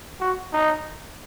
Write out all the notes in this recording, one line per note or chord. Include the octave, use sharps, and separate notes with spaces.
F#4
D#4